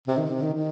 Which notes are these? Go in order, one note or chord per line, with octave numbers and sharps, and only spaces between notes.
C3
D#3
C3
D#3
D#3